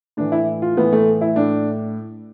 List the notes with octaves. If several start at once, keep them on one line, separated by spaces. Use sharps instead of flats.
A2 E3 D4
E4
F4
A2 E3 B3
A3
E4
A2 D4